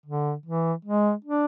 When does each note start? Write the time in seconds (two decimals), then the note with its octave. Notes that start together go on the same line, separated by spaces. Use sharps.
0.06 D3
0.46 E3
0.85 G#3
1.25 D4